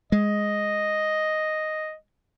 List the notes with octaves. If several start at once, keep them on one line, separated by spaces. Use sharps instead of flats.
G#3 D#5